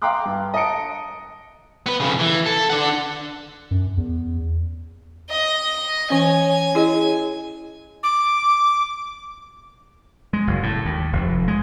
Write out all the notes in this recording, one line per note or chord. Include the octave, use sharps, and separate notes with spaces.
F5 G5 A#5 C6 D6 F#6
G2
D#5 A5 A#5 C#7 D7
B3 B4
F2 C#3
E3
A4
D4 F#5
F#2
E2
D#5
E3 C#4 C#5 G#5
E4 G#4 D#5
D6
G#3
F#1
A2
D#2
F1
G#3